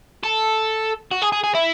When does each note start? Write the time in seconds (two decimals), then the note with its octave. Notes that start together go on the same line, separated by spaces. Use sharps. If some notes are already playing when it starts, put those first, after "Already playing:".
0.23 A4
1.11 F#4
1.22 G#4
1.32 G#4
1.44 G#4
1.55 E4